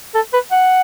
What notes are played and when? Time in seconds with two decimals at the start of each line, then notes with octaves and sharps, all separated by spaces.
0.15 A4
0.33 B4
0.52 F#5